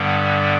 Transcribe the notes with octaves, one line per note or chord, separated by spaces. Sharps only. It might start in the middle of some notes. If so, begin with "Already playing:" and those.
Already playing: G2 D3 G3 B3